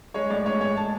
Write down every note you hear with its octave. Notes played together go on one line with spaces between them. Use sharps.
G#3 C#5
A2 D5
G#3 C#5
A2 C#5
G#3 A5